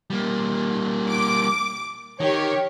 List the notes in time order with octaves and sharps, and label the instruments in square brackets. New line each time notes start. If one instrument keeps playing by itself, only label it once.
[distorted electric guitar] G3 A#3
[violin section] D6
[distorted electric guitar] D#3 [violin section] G4 C#5